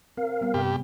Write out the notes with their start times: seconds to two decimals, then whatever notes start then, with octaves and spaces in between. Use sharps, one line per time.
0.17 C4 A#4 F5
0.41 G3 B3
0.54 G2 C3 G4